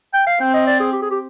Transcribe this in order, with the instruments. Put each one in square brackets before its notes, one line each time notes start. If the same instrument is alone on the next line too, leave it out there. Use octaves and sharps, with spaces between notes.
[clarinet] G5
F5
[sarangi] C4 [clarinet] G5
[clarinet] D#5
D5
G#4
G4
G#4
G4